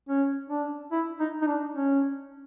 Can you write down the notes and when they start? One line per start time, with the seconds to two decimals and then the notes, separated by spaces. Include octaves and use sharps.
0.09 C#4
0.50 D4
0.92 E4
1.20 D#4
1.42 D#4
1.47 D4
1.74 C#4